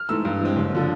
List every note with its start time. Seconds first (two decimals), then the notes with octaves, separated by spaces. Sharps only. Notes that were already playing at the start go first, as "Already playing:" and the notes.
Already playing: F6
0.09 G#2 E3 A3 E6
0.25 G2
0.41 E3 G#3 C4
0.57 F#1
0.75 D3 F3